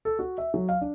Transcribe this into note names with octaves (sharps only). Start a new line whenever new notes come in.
A4
F#4
E5
F#3
F5
D4